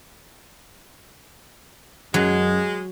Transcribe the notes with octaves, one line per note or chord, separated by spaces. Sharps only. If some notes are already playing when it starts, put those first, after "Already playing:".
F#2 F#3 G#3